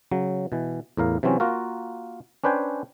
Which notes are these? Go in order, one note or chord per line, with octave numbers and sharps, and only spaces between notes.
C#3 F#3
B2 E3
E2 A2 A#4 F5
C3 E3 F#3 C4 C#4
A#3 F4 F#4 A#4
C#4 D4 B4 C5 G5 G#5